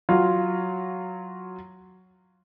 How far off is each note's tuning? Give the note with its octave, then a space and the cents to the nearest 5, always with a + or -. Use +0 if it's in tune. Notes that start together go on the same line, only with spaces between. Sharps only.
F#3 +0 F4 +0